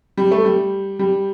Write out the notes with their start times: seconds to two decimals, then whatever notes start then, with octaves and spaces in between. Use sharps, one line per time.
0.17 G3
0.31 A3
0.45 G3
0.99 G3